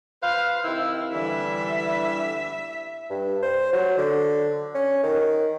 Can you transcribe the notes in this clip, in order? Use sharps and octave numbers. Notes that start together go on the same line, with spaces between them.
B4 C5 F5
C3 D#3 E4 E6
D3 E3 G3 E5
G2
C5
F#3
D3
C#4
D#3